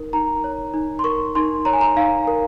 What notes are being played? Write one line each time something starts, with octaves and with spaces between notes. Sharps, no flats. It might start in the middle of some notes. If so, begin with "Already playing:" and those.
Already playing: D#4 A#4
D#4 A#5
C#5
D#4
C6
A#4 C#6
D#4 C6
C#5 A#5
G#5
A#5
D#4 F5
A#4